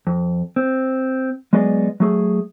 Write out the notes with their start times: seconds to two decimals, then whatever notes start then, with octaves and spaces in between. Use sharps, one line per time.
0.07 F2
0.56 C4
1.53 F#3 G#3 B3 G#4 D5 D#5
2.00 F#3 A3 G#4